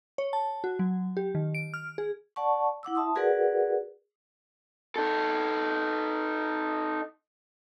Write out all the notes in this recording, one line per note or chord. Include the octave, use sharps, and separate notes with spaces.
C#5
A5
F#4
F#3
G4
D#3
D7
F6
G#4
D5 F#5 A5 C#6
E4 F#5 D6 E6
E5 A5 C6 D#6
F#4 G#4 A#4 B4 D5 F#5
D#4 A4